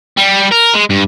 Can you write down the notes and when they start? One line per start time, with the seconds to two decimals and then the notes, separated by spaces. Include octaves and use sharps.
0.17 G3
0.51 A#4
0.74 G#3
0.90 G2